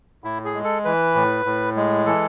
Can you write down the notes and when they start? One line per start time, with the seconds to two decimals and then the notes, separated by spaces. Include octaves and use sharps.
0.24 A2 E4
0.45 G#4
0.54 G#3
0.64 A4
0.85 E3 B4
1.15 A2
1.45 A2
1.76 G#3
2.06 E3 A4